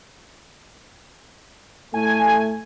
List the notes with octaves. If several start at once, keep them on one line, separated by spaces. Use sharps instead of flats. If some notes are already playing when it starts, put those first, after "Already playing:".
A2 A3 G#5